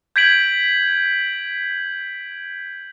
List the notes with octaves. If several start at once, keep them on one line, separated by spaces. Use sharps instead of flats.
G6 G#6 B6 D7 F#7